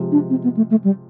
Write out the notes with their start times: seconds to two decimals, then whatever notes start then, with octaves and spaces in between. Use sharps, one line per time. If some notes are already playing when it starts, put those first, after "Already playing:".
Already playing: C3 F3 G#3
0.12 D4
0.30 C4
0.44 B3
0.57 A3
0.71 A3
0.84 G3